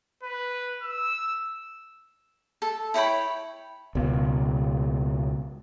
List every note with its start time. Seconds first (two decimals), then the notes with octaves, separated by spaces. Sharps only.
0.23 B4
0.83 E6
2.62 A4
2.94 E4 C#5 G5 B5
3.95 C#2 B2